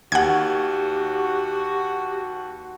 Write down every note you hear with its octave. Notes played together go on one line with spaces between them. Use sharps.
D#2 F#4 G4 F#5 G#6